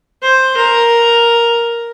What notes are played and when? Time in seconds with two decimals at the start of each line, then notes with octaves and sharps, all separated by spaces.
0.22 C5
0.57 A#4